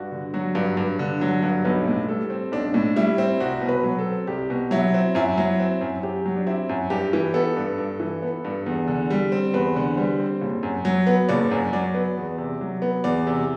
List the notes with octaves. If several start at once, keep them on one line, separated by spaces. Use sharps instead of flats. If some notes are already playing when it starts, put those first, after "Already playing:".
Already playing: G2 F#4
D3
F#3 F#4
G2
G2
D3
F#3
G2
B1 B4
A2
G3 A4
C4
B1 D4
A2
G3 E4
C4
C2 F#4
B2
B4
F#3
A4
C4
C2 G4
B2
F#3 E4
C4
F#2 E4
F#3
C4
F#2
F#2 G4
F#3
D4
C4 E4
F#2
G2 G4
E3
B3 A4
G2
G2
E3
B3
G2
E2
D3
G3
C4
E2 B4
D3
G3 C5
C4
F#1
F#2
F#3
B3
F#1 D5
F#2
F#3 D5
B3
E2
C3
F#3
B3
E2 D5
C3